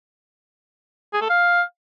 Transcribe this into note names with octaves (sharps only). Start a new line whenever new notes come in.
G#4
A4
F5